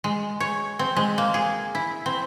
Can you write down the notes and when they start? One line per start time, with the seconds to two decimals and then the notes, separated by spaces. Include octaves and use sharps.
0.04 G#3
0.40 C#5
0.79 C4
0.96 G#3
1.18 A#3
1.34 G#4
1.75 E4
2.06 C4